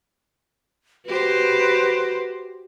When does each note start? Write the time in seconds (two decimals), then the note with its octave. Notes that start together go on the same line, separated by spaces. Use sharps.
1.06 F#4 G4 B4 C5